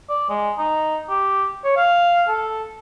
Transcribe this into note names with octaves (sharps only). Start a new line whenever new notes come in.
D5
G#3
D#4
G4
C#5
F5
A4